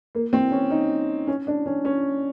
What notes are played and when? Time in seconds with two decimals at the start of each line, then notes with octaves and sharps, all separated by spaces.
0.15 A#3
0.33 C4
0.52 C#4
0.70 D#4
1.27 C#4
1.47 D4
1.66 C#4
1.85 C#4